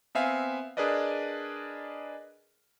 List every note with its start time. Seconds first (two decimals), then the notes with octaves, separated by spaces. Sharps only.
0.15 B3 C4 E5 F5 G#5
0.77 D4 G#4 A#4 B4 D5 D#5